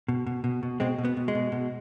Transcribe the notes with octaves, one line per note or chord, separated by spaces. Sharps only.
B2
B2
B2
B2
B2 G#3 C4
B2
B3
B2
G#3
B2
B2